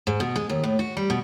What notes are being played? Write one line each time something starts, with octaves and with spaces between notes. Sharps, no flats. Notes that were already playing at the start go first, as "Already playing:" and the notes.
G#2
B2
G#3
D#2
A2
F#4
G3
B2